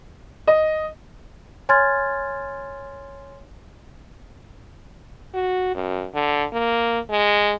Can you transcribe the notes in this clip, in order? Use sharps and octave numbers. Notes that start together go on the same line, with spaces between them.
D#5
C#5 G#5 C6 F6 G#6 A6
F#4
F#2
D3
A#3
G#3